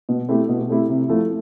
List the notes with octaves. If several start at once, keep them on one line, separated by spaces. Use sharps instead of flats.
B2
A3 C4 E4 G4
B2
A3 C4 E4 G4
C3
F3 A3 E4